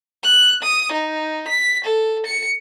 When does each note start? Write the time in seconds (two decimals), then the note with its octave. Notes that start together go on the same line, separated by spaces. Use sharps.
0.23 F#6
0.62 D#6
0.92 D#4
1.47 B6
1.84 A4
2.26 C#7